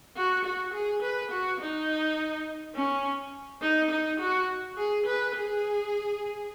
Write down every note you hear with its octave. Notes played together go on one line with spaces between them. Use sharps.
F#4
F#4
G#4
B4
F#4
D#4
C#4
D#4
D#4
F#4
G#4
B4
G#4